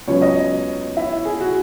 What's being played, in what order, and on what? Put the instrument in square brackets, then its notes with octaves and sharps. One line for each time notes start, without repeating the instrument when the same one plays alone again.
[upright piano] C#2 C#3 F#3 B3 C#5
D#5
E4
G#4
F#4